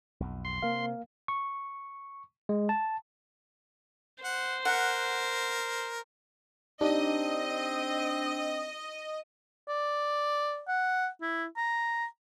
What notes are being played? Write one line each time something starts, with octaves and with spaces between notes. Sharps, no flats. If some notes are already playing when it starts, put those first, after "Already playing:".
B1 F2
C6
C3 A#3 A#4 F5
C#6
G#3
A5
C5 F#5
A#4 F#5
C4 D4 D#4 G4 D#5
D5
F#5
E4
A#5